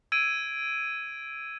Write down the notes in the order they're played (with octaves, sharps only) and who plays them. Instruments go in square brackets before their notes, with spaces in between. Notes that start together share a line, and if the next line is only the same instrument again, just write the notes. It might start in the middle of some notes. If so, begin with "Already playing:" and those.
[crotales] E6 G#6 D7 D#7